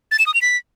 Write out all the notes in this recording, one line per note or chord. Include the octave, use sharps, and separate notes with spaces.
A6
E7
D#6
F7
B6